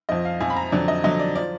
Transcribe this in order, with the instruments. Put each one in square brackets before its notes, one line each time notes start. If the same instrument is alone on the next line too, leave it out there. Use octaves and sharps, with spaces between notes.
[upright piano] F2 F3 D#5
F5
F2 F3 G#5
B5
A#5
F2 D3 F#3 D5
D#5
F2 D3 F#3 D#5
D5
F3 D5